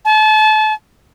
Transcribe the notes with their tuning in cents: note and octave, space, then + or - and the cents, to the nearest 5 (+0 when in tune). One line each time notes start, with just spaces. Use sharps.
A5 -35